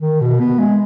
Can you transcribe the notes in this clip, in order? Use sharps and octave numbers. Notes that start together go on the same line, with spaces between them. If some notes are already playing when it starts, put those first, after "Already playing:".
D#3
B2
B3
G#3